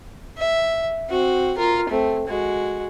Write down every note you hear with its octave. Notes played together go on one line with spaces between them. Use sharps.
E5
C4 F#4
F4 A#4
A3 C4
G#3 F#4